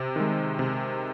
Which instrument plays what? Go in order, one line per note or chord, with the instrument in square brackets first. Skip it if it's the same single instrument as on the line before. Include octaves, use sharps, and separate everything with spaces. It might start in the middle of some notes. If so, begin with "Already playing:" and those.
Already playing: [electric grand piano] C3
D#3 G#3
C3